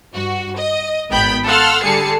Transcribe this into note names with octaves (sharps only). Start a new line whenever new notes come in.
G2 F#4
D#5
G#1 B3 G5 B5 G6
A4 F5 F#5 C6 E6 F6
D3 G3 G#4 A5 C7 C#7